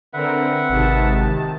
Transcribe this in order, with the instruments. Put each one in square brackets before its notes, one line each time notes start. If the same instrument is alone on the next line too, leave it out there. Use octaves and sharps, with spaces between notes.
[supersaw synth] D3 C4 A#4 [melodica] B4 E5 F#5
[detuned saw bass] G#1 [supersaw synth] C3 D#3 A5